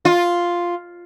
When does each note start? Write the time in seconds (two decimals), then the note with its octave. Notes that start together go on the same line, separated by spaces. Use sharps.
0.05 F4